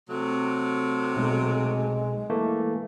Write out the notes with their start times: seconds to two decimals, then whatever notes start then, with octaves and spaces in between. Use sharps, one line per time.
0.08 C3 F#3 A3
1.16 B1 G#3
2.30 E3 A3 A#3